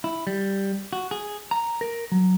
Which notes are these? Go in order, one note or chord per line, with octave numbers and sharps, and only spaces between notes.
E4
G3
F#4
G#4
A#5
A#4
F#3